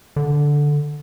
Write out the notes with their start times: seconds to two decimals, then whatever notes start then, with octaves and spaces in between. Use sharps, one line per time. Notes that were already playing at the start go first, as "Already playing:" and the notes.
0.16 D3